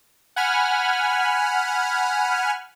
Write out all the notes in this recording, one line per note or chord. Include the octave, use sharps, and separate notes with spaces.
F#5 G#5 B5 F6